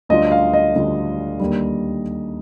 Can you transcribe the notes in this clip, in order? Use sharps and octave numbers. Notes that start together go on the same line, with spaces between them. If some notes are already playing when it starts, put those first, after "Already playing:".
D2 D3 G3 D4 F4 D#5
F5
D#5
D2 D3 G3 D4 F4
D#2 D3 G3